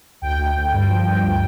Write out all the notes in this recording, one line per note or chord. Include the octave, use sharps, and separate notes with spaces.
D2 G5
D2
D2
G2
F3
G2
D2